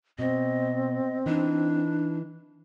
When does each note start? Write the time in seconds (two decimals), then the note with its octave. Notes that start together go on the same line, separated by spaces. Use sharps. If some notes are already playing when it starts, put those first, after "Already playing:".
0.19 B2 C4 D#5
1.26 E3 D4 D#4